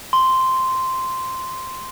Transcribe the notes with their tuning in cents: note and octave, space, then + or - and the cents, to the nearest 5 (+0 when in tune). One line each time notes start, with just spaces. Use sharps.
C6 -5